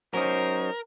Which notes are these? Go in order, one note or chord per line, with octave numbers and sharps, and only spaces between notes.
F#3 C#4 D#4 A#4 C5